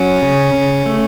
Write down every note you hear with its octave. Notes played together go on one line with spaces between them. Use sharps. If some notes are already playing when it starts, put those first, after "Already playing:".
Already playing: F#3 C#4
C#3
C#3
A3